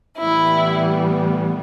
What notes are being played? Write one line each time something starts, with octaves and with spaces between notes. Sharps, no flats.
A2 E3 G3 B3 E4